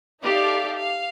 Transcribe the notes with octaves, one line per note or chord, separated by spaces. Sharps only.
D#4 G4 A4 D5 E5 F5
F5